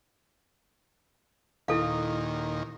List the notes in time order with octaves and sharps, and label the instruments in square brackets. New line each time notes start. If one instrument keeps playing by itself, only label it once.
[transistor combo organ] D#2 A#2 D#3 [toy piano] E4 A4 F5